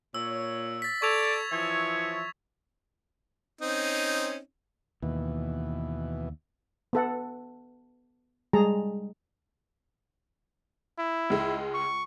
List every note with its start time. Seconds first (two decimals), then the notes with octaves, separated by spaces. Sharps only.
0.14 A#2 C#5 E6
0.82 A6 B6
1.02 A4 D5 C#6 G#6 F7
1.51 E3 F3 C#5 E5
3.61 C4 C#4 D#4
5.02 D#2 B2 E3
6.93 B3 A4 F#5
8.53 G3 G#3 G#4 A5 A#5
10.99 E4
11.30 C#2 G#3
11.74 C#6